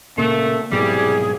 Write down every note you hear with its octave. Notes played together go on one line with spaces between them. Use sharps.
A#2 C#3 A3 A#3
C2 G#2 B2 F#3 G3 G#4